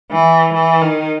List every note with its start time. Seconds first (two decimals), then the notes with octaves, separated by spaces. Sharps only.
0.11 E3
0.53 E3
0.81 D#3